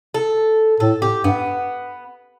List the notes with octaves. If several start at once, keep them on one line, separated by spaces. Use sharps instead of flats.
A4
A2 A4
G4
G2 B3